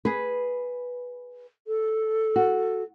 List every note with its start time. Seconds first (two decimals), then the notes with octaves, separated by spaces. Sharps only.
0.05 G#4 B4
1.67 A4
2.36 F#4